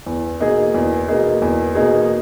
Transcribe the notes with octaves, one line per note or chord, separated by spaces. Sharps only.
E2
B2 A#3 D#4 G#4
E2
B2 A#3 D#4 G#4
E2
B2 A#3 D#4 G#4